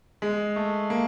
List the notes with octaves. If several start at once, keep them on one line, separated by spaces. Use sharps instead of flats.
G#3
A3
A#3